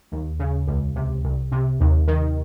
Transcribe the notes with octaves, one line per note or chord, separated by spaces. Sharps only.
D#2
C#3
C#2
C3
C2
C3
D#2
D#3